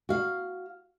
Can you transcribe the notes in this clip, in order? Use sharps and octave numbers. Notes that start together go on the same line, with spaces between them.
F#4 F5